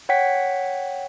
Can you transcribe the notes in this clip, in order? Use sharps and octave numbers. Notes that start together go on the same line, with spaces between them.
C#5 F#5 G5 B6